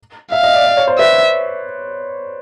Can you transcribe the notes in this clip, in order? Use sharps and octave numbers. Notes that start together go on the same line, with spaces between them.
E5 F5
D#5
D5
D5
C#5
C5
B4 E5